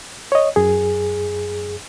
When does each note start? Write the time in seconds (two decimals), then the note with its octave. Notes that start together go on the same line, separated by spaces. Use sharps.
0.32 C#5 D#5
0.56 F#2 G#4